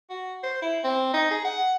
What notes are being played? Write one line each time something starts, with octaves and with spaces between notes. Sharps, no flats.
F#4
C5
E4
C4
D#4
G#4
F#5